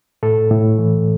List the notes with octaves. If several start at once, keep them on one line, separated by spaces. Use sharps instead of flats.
A2 A4
A2
E3